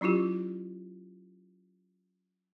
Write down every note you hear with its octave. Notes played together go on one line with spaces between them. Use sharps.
F#3 C#4 E4 F4 G4